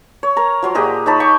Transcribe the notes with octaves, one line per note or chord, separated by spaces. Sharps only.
C#5
A#4 A#5
F3 F#3 C6
A#2 G4 G#4 D#5
D#4 C#5 A5 B5
G5 C#6 D6